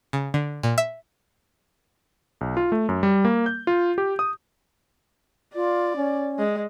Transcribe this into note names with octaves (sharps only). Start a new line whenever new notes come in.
C#3
D3
A#2
E5
B1
F4
A3
F#2
G3
A#3
G6
F4
G4
D#6
F4 D5
C#4
G#3